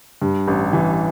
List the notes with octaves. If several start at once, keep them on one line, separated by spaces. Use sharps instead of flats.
G2
A1
E3